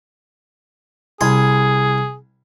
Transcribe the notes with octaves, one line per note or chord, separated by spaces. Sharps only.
C2 G#4 G#5 C6